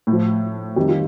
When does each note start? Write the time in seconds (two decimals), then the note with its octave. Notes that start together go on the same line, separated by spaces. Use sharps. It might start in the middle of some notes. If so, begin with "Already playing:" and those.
0.07 A2
0.12 F3
0.76 F2 D#3 G3 G4
0.89 F4